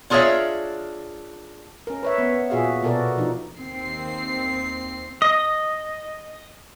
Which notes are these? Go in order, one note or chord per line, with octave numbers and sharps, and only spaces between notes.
D4 F4 G#4 A#4 C#5 E5
C#4 A#4
B4 C#5 E5
B3
A#2 F#4 G#4 E5 F5
B2 B3 F#4 A4 A#4 D5
F3 D4 D#4
D#2 C4 C7
D#5